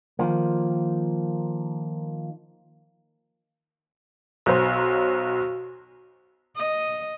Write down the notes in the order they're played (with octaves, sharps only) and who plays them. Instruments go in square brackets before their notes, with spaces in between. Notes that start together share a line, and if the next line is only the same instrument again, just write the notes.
[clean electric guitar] D#3 F3 A#3
[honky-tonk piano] B1 F#3 C5
[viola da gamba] D#5